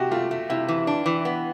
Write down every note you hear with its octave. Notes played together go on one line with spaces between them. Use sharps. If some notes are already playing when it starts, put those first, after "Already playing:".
Already playing: C3 F#4 G4
A3 F4
A3
C3 E4
E3
D4
E3
B3